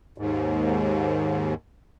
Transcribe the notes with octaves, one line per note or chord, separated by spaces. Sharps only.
D#2 G#2